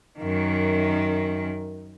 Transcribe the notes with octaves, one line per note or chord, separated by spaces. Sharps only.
F#2 D#3